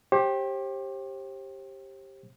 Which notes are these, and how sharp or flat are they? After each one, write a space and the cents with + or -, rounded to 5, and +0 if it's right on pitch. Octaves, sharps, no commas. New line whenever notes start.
G4 +0 C5 +40